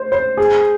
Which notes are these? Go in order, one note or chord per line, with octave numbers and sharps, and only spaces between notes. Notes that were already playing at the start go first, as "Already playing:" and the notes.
Already playing: C5
C5
G#4